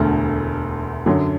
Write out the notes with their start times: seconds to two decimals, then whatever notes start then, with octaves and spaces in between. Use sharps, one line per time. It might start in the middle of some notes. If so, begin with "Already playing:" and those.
Already playing: E1 D2 D3 A3
1.06 F#2 D3 F#3